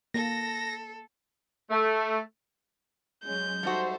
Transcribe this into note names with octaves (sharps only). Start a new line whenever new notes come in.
A#3 A4 A#6
A3
F#3 G#3 C#4 G6
G3 D#4 F#4 A4 C5 E5